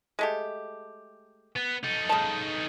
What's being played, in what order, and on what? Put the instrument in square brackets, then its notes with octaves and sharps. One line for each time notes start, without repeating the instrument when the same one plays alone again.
[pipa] G#3 A3 G4
[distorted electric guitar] B3
D#4 A4
[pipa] C#3 A5